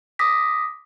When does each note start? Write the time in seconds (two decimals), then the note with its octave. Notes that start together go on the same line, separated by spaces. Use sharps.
0.19 D6 D#6 A#6 B6